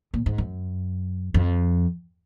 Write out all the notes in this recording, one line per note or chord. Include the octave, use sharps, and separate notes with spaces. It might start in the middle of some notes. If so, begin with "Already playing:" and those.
A#2
G#2
F#2
F2